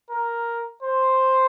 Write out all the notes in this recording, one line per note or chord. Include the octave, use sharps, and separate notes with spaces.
A#4
C5